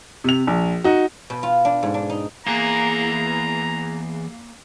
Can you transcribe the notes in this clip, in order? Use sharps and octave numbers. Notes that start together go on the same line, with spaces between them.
C3 F7
A#1
D#4 F#4
B2
F4
D4
G#2
D4
D#4
E2 A#3 G#4 A#5